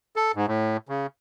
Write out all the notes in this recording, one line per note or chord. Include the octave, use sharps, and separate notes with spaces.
A4
G#2
A2
C#3